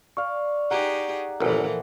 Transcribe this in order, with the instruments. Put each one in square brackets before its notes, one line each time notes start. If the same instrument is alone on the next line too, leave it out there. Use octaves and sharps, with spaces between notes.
[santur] D5 F5 [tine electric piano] C#6
[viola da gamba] D#4 G4 G#4 [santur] F#5 A#5
[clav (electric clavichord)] G1 E2 [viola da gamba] A#2 E3 F3 [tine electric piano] A4 A#4